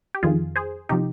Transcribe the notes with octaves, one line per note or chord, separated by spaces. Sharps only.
G4
F2 D#3 F4 G#4
G#4 C5
C3 F3 D#4 G4